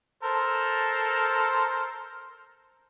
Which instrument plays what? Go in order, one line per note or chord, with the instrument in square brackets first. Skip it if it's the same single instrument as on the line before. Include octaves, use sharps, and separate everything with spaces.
[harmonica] A4 A#4 C5